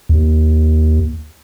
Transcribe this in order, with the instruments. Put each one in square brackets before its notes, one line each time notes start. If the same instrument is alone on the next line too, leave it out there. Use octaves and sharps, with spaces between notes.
[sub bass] D#2